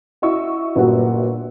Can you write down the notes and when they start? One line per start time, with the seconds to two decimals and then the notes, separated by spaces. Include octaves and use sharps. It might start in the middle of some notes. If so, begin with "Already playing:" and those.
0.22 E4 F#4 D#5 C#6 E6
0.76 G1 A#2 F#3 F#4 G4